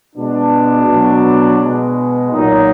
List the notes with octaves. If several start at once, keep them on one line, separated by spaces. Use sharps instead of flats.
B2 G#3 D4
B2 F#3
B2 G#3
A#2 F#3 D#4